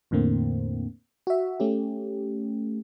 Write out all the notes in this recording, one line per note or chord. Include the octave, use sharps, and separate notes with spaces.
E2 A2 D3 A#3 C4
F#4 E5
A3 C#4 G4